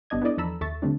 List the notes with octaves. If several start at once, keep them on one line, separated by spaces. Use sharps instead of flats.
G#1 G3 B3 D4 D#5 G#6
B3 D4 E4 A4 D5 D#5
E2 F3 A4 A#5 B5 E6
D#2 A4 E5 C#6 A6
D3 G3 A3 C4 D4